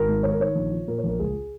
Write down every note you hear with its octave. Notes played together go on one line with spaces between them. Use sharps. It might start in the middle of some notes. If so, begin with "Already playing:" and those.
Already playing: G#1 A#4
G#2
D#3 C#5
A#4
D#3 C#5
A#1
F3
A#2 A#4
C#5
A#1 A#4
C#2 G#4